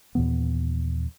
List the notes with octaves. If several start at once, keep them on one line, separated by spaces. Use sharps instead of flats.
D#2 A#2 E3 B3